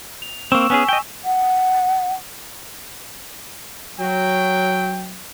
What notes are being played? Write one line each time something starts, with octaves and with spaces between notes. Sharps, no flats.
F7
A#3 C4 C#6 E6 E7
B3 C#4 G#4 G#5 B6
D#5 G5
F#5
F#3 G5